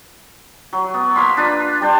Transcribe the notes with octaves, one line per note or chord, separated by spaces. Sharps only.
F#3
B3
A#3 F5 B5 C6
D4 F4 B4
G3 D4 C5